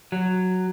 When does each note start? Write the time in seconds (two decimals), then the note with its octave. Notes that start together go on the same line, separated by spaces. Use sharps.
0.12 F#3